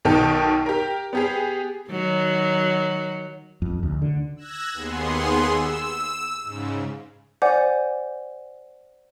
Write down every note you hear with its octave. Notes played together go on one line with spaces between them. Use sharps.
B1 B2 D#3 A4 G5
G4 A#4
B3 G4 G#4
D#3 F#3
F2
D2
D3
E6 F#6 G#6 A#6
D#2 B3 G#4 C6
E6
G#2 C#3
C5 D5 F#5 G#5 D6 G6